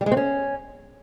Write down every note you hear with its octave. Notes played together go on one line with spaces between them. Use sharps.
G3
G#3
C4
C#4